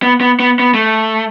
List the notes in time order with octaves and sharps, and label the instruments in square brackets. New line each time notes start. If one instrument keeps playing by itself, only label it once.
[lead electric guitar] B3
B3
B3
B3
A3